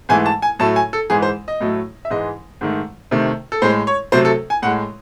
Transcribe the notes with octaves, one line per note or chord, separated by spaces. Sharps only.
G#2 E3 A3 G#5
A5
G#5
A2 F#3 A3 A5
G#5
A4
G#2 E3 G#3 G#4
C5
D#5
A2 F#3 A3
E5
G#2 E3 G#3 D#5
G#2 D#3 A3
C3 D#3 A3
A4
A2 G#3 C5
C#5
C3 F#3 A3 C5
A4
G#5
A2 G#3 F#5